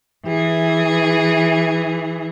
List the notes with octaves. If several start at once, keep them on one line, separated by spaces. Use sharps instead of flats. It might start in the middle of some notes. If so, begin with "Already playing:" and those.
E3 G#4